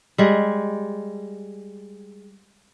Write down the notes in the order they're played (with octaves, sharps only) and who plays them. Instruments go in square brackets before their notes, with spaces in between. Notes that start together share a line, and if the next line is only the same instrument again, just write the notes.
[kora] G3 G#3